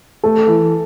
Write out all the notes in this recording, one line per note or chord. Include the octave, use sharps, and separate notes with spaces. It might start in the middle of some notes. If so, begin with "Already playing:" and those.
A3 A4
E3